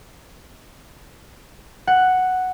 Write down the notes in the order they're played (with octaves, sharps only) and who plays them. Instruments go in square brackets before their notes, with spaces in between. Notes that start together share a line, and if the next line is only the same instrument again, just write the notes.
[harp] F#5